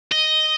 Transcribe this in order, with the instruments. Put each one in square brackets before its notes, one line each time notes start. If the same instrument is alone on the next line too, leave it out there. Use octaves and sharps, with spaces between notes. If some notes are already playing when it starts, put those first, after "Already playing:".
[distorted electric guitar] D#5